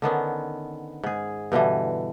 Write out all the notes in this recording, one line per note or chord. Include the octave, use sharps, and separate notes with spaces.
D3 D#3 B3 C#4
G#2 G#4
G2 B2 D3 E3